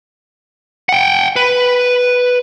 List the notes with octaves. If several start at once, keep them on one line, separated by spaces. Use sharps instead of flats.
F#5 G5
B4